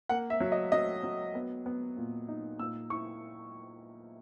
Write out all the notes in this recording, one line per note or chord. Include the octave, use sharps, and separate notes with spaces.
A#3 F#5
E5
F#3
D#5
F#3 D#5
F#3
B3
B3
A#2
D#4
A#2 E6
E4 C#6